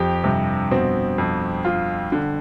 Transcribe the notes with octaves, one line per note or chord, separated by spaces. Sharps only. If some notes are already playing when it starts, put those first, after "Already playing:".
Already playing: F2 G4
G2 C3
B2 C4
F2
F4
D3